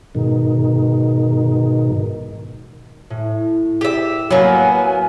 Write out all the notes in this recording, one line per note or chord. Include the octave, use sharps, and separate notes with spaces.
G#2 B2 D#3
A2
G4 E5
F#3 A#3 B3 G#5